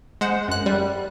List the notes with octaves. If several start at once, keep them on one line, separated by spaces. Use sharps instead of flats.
G#3 C5 F#5
F#2 F#6
G3